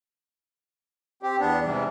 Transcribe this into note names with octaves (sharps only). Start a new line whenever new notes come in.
C4 G4
E2 B3 D4
G#2 C3 E3 G3